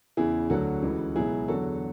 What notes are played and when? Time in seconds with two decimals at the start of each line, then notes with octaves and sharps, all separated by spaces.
0.17 E2 C#3 E3 E4 G#4
0.50 D2 D3 F#3 F#4 A4
0.82 C#2 C#3 E3
1.16 C#2 B2 F#3 E4 G#4
1.48 E2 D3 F#3 F#4 A4